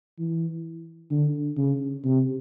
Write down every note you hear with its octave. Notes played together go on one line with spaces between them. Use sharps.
E3
D3
C#3
C3